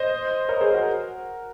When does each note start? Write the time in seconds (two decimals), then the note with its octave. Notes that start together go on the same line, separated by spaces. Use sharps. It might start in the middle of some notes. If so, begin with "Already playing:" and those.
Already playing: C5 D#5
0.49 A#4 C#5
0.61 G#4 C5
0.74 F#4 A#4